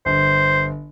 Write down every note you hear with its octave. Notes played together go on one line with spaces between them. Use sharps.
G1 C5